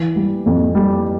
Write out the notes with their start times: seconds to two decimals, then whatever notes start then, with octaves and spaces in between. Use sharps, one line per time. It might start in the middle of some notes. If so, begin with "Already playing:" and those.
Already playing: E3
0.16 G3
0.46 F2
0.75 G3